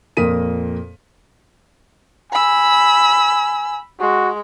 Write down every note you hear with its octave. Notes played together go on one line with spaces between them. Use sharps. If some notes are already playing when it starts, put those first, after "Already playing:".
F2 A#2 A#4 D#6 B6 D#7
G#5 B5 E6
G#3 F#4